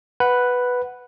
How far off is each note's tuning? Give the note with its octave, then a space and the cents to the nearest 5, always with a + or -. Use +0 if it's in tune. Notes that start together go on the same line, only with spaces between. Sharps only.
B4 +0 F#5 +0